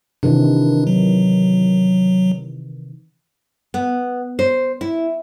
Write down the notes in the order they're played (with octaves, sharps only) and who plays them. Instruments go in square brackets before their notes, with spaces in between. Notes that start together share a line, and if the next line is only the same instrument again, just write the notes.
[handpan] C3 D#3 E3 [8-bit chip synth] D4
[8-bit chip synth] F#3
[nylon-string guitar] B3
C5
E4